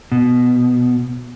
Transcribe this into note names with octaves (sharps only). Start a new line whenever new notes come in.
B2